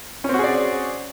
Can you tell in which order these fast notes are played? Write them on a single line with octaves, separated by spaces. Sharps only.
C#4 C4 F#4 G#4 D5